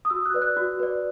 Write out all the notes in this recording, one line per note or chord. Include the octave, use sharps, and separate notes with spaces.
D#6
F#4 E6
F#6
B4 D5
F#6
F#4
B4 D5